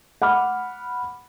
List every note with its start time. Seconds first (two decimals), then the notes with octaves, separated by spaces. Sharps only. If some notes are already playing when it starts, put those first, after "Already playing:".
0.22 F#5 B5 D6 F6